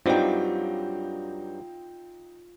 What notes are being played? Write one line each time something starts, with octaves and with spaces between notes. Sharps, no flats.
G2 F#3 G3 C4 D#4 F4 G5